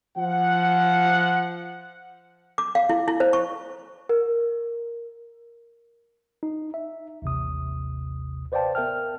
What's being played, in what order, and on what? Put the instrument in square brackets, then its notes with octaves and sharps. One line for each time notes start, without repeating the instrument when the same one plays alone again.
[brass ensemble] F3 F#5
[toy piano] D6
F5
E4
E4
C5
C#6
[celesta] A#4
[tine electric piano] D#4
E5
A1 D#2 C3 D#6
B4 C5 D5 F5 G5 A5
B3 A#4 E5 G5 F6